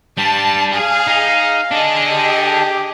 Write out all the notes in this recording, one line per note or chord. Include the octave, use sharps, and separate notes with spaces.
G3 D4 A5
G#4 F5
D#4
D4 G#4 A4 D#5
G4